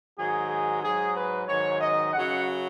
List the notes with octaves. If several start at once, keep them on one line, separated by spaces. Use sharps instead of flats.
G#2 D#3 F#3 G#4
G#4
G#2 F#3 G#4
B4
G#2 D#3 F#3 C#5
D#5
F#2 C#3 F#3 F#5